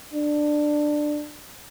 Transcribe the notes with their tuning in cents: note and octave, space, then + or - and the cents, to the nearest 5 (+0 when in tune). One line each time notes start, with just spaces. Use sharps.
D4 +15